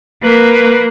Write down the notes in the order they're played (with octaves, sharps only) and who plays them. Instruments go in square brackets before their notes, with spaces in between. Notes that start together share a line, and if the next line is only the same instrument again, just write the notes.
[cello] A#3 [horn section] B4